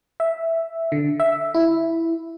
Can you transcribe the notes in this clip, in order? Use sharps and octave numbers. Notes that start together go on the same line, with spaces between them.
E5
D3
E5
E4